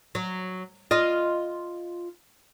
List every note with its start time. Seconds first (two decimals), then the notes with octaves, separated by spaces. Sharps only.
0.15 F#3
0.91 F4 D#5